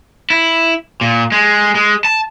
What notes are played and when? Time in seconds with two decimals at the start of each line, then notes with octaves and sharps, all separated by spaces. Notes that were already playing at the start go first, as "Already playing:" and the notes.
0.30 E4
1.01 A#2
1.32 G#3
1.75 G#3
2.05 A5